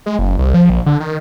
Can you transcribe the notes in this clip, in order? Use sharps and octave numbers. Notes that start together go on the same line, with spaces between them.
G#3
F#1
C2
F3
A#1
D3
D#3